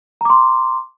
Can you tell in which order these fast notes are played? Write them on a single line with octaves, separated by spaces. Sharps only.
A#5 D6 C6